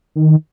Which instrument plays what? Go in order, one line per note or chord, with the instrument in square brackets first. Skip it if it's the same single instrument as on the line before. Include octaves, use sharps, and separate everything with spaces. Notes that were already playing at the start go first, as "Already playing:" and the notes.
[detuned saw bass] D#3